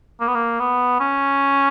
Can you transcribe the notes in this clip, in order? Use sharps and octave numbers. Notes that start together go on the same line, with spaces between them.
A#3
B3
A#3
B3
C#4